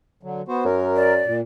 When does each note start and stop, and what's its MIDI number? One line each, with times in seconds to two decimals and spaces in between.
0.23 0.42 50
0.23 0.42 54
0.48 0.64 59
0.48 0.64 66
0.48 0.64 72
0.65 1.25 42
0.65 1.14 70
0.96 1.35 74
1.26 1.41 46